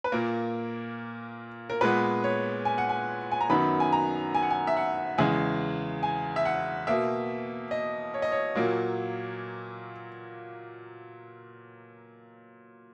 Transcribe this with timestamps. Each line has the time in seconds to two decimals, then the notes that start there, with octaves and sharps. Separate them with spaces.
0.04 B4
0.12 A#2 A#3 A#4
1.70 A#4
1.81 A#2 G#3 B3 B4
2.24 C#5
2.65 G#5
2.78 F#5
2.89 G#5
3.32 G#5
3.41 A#5
3.50 F#2 D#3 F#3 B3 B5
3.80 G#5
3.92 A#5
4.35 G#5
4.42 F#5
4.50 G#5
4.67 E5
4.77 F#5
5.18 E2 C#3 G#3 G#5
6.03 G#5
6.36 E5
6.45 F#5
6.87 B2 A#3 E5
7.71 D#5
8.14 C#5
8.22 D#5
8.32 C#5
8.55 A#2 F#3 A#3